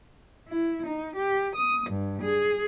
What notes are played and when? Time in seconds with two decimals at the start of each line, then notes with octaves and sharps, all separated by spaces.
0.48 E4
0.86 D#4
1.15 G4
1.55 D#6
1.89 G2
2.21 G#4